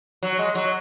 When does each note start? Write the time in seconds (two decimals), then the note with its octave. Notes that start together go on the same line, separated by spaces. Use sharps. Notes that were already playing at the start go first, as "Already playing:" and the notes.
0.23 F#3
0.39 G#3
0.55 F#3